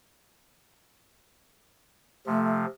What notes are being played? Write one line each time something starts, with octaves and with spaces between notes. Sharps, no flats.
C3 F3 A3